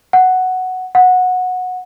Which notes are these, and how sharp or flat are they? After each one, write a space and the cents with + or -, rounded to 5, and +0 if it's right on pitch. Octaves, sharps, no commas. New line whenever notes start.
F#5 +5
F#5 -15